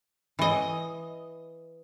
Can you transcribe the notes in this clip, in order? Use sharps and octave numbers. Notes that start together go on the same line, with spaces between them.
E3 D#5